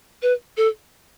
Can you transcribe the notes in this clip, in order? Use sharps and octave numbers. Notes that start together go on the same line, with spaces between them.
B4
A4